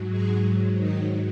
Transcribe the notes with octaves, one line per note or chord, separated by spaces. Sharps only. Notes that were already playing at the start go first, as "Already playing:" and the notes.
Already playing: G#2 F#3
G#3 G#4
D#3 D#4